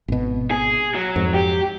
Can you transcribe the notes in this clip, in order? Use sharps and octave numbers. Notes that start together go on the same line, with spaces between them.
G#1 B2
G#4
F#3
F2 G#2
G4